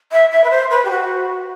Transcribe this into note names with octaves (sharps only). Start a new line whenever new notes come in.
E5
E5
B4
C5
B4
G4
F#4